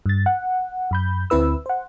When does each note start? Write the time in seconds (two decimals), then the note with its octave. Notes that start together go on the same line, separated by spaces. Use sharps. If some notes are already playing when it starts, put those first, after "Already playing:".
0.06 G2 A6
0.26 F#5
0.91 F#2 B5 G6
1.30 D2 C4 E4 B4 E6
1.66 C5 F#5